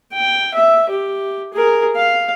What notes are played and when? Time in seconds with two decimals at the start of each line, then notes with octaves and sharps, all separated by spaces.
0.13 G5
0.55 E5
0.90 G4
1.53 G#4 A#4
1.96 F5